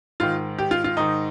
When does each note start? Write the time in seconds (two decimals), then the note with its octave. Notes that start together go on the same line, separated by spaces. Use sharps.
0.20 G#2 D#3 F4
0.58 G4
0.71 F4
0.84 F4
0.97 G#2 D#3 D#4